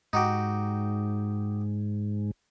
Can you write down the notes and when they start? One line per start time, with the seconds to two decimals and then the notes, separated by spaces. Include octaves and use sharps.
0.13 G#2 D#4 F#4 G4